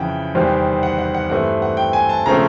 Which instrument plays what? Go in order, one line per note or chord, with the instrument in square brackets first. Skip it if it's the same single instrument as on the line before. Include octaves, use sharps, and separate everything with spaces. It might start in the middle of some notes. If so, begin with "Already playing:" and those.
Already playing: [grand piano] F2 C#3 E3 F#5 G5
E2 C3 D#3 G3 C4
F#5
F#5
F#5
G2 E3 A3 C4 F#5
F#5
G5
G#5
A5
C#3 F3 A3 C4 A#5